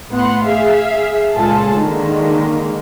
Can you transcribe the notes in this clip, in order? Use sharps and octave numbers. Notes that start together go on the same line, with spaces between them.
A2 B3 F#5 C6
G#4 E5 F5
C#2 A#2 F4 G#4 A4 A5
D3 D#3 G#3 A#3